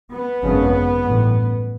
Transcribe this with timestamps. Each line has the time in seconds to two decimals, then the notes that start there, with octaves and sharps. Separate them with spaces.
0.12 B3
0.43 G#1 F#2 C#3
1.05 A1 G2